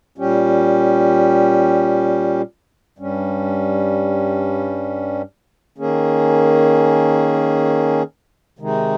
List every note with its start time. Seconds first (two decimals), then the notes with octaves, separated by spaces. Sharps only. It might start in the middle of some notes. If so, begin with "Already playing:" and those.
0.18 A#2 G3 C#4 G4
2.98 G2 G3 C#4
5.78 D#3 A#3 C#4 G#4
8.59 C3 D#3 G#3 D#4